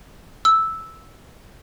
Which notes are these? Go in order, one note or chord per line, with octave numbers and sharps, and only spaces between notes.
E6